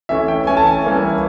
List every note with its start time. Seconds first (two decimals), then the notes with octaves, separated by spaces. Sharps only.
0.09 E3 A3 C#4 E5
0.28 G5
0.47 E3 A3 C#4 G#5
0.57 A5
0.67 G#5
0.84 E3 G3 A#3 C#4